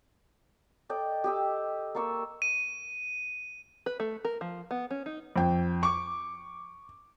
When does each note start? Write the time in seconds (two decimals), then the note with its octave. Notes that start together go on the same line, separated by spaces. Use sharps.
0.89 A4 D5 D#5 G5
1.24 G4 D#5 E6
1.95 A#3 D5 C#6 E6
2.42 D#7
3.86 B4
4.00 A3
4.25 A#4
4.41 F3
4.71 B3
4.91 C#4
5.06 D#4
5.36 F2 G5
5.83 C#6 D6